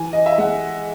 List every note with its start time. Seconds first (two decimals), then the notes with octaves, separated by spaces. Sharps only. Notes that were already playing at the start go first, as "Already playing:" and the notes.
Already playing: E3 G#5
0.13 D#5
0.26 E5
0.38 G#3 F#5